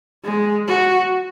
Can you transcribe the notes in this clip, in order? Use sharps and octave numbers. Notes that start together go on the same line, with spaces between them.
G#3
F#4